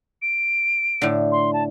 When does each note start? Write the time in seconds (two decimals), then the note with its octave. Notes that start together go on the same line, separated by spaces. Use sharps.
0.22 D7
1.02 A2 D3
1.32 C6
1.53 A5